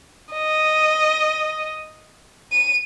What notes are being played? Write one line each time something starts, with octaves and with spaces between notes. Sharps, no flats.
D#5
D#7